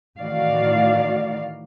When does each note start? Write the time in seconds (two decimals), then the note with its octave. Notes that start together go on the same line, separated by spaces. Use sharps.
0.19 A2 D#3 E3 F#4 D5 F5